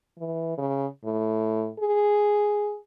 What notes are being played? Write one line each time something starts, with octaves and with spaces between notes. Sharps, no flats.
E3
C#3
A2
G#4